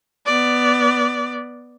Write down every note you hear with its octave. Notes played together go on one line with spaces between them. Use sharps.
B3 D5